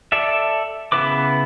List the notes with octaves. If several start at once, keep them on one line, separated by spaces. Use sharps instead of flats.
A4 D5 E5
C#3 B3 E4 B4 D6